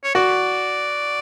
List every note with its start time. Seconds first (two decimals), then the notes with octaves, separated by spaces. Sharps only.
0.04 C#5
0.15 F#4 D5